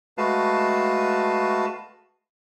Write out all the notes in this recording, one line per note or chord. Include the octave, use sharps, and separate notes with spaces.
G#3 A3 F#4 B4 F5 A5